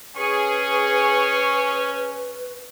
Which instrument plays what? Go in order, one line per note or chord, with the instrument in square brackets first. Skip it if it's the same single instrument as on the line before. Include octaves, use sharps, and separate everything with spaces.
[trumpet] C#4 [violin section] G#4 [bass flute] B4 [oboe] C#6